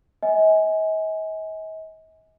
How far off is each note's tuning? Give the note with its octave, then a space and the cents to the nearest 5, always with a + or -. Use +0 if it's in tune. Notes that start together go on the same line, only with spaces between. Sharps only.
D#5 +45 G#5 +0